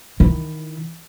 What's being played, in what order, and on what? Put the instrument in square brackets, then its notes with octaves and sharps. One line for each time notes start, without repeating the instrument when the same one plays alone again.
[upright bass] D#3 E4